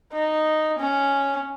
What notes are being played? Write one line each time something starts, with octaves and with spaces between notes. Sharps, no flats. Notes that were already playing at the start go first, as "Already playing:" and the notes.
D#4
C#4